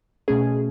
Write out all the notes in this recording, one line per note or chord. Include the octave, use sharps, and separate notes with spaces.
B2 A3 C#4 G#4